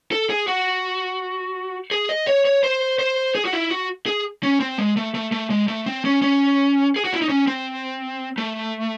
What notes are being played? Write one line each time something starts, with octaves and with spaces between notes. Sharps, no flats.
A4
G#4
F#4
G#4
D#5
C#5
C#5
C5
C5
G#4
F#4
E4
F#4
G#4
C#4
C4
G#3
A3
A3
A3
G#3
A3
C4
C#4
C#4
G#4
F#4
E4
D#4
C#4
C4
A3